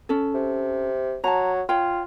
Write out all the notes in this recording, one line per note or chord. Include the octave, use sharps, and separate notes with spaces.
C#4 A4
C3
F#3 A5 A#5
F4 C#5 G5